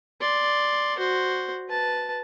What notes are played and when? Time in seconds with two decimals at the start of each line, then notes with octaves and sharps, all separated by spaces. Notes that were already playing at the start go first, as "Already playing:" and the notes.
0.21 D5 C6
0.98 F#4 C5
1.69 B4 A5